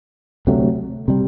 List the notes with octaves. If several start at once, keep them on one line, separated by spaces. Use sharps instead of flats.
D2 C3 F#3 A3
C3 G3